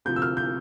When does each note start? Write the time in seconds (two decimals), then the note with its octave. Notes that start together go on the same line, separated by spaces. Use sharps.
0.05 D2 C3 F3 G6
0.16 E6
0.22 F6
0.37 G6